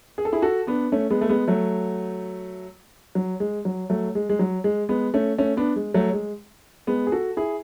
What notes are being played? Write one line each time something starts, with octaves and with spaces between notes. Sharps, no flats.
G#4
A4
E4 G#4
F#4 A4
B3 D4
A3 C#4
G#3 B3
A3
G#3 B3
F#3 A3
F#3
G#3
F#3
F#3 A3
G#3
G#3
F#3
G#3
G#3 B3
A3 C#4
A3 C#4
B3 D4
G#3
F#3 A3
G#3
G#3 B3
G#4
F#4 A4
E4 G#4